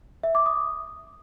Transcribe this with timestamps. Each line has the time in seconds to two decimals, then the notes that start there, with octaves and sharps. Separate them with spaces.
0.23 E5
0.35 D6
0.46 D#6